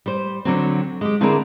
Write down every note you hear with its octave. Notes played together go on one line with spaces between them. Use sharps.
G3 C5
D3 F#3 C4
G#3 G4
D3 C4 D4 E4 G#4 A#4